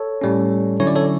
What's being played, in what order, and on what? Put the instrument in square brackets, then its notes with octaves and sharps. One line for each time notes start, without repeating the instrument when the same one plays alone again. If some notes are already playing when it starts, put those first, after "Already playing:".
Already playing: [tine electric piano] A4 C#5
A2 G3 C#4
D3 F#3 C#4 E4 C#5
D5
A4 C#5